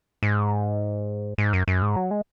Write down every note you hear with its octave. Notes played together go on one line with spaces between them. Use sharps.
G#2
G#2
F#2
F#2
G#2
F#3
G#3